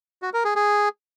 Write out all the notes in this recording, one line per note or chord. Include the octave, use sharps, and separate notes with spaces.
F#4
A#4
G#4
G#4